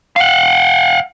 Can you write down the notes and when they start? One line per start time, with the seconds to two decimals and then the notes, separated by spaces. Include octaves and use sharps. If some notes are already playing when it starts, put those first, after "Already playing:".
0.16 F5 F#5